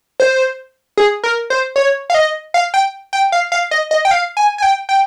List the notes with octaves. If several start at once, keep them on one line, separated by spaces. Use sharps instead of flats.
C5
G#4
A#4
C5
C#5
F5
D#5
F5
G5
G5
F5
F5
D#5
D#5
G5
F5
G#5
G#5
G5
G5